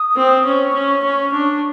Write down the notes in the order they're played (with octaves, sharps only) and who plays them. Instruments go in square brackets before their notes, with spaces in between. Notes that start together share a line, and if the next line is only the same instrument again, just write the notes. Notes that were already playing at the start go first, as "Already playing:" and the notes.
Already playing: [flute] D#6
[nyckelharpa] C4
[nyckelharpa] C#4 [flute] C#6
[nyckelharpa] C#4
C#4
D4